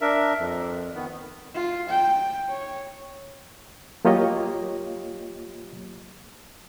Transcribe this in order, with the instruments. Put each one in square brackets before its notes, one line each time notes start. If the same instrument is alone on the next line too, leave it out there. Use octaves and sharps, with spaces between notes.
[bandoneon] D4 A#4 E5
F2
D#3 B3
[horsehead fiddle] F4
G5
C#5
[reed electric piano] F#3 A#3 F4 G4 C#5 D#5